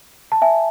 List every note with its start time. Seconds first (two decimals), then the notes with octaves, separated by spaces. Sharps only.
0.32 A5
0.42 E5 G#5